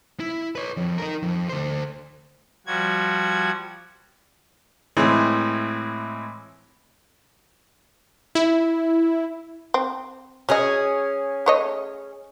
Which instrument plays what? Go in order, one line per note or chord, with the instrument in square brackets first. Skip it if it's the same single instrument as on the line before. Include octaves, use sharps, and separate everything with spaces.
[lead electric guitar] E4
B4 C#5
F2
D#4 A#4
F2
D2 C5
[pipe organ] F3 G3 F#4 G#6
[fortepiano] A2 E3 G#3 C4
[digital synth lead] E4
[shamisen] C4
[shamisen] F#3 D#5 [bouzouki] C#4 G#4
[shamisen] A3 C#5 D#5